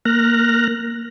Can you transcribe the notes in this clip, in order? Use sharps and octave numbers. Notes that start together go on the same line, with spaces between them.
A#3 F6 F#6 A#6